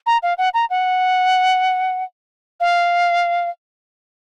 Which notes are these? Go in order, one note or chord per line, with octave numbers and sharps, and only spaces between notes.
A#5
F5
F#5
A#5
F#5
F5